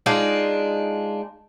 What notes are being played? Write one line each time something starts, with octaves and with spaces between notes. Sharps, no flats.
G#3 D4 D#4 F4